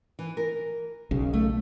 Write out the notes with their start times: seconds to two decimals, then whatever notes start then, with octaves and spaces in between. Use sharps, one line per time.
0.19 E3
0.37 A#4
1.11 B1 C#3
1.33 A3